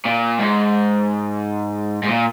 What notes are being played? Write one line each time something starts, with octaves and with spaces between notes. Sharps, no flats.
A#2
G#2
G#2
A#2